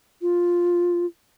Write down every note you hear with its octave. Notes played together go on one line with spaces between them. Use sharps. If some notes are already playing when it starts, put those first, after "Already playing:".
F4